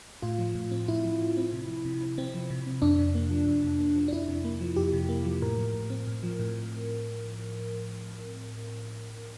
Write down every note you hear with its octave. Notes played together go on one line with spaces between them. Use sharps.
A2 F4
F3
A2
C4
A2 E4
F3
A2
C4
C3
F3
C3
C4
C3 C4
F3
C3
C4
F2 D4
C3
A#3
F3
F2
C3
A#3
F3
D4
F2 E4
C3
A#3
F3
F2 G4
C3
A#3
F3
A2 A#4
F3
A2
C4
A2
F3
A2